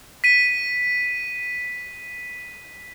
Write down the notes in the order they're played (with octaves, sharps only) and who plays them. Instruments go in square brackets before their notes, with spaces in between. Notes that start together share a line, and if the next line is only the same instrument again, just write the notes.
[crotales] B6 D#7